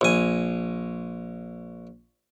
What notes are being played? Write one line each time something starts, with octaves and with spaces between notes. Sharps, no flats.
A#1 G#5